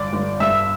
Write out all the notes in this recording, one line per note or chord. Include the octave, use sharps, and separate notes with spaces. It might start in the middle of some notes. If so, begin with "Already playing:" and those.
Already playing: G1 D5 D6
G1
G2 E5 E6